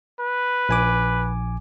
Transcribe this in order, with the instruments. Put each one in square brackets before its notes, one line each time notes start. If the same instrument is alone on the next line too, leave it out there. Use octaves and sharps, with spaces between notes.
[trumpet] B4
[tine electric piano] A#1 G#5 D6